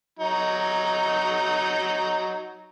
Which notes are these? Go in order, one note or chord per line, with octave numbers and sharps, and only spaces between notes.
F#3 D#4